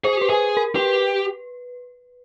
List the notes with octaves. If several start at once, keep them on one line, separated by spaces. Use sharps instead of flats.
G#4 C5
G4 B4
G#4
A#4
G4 B4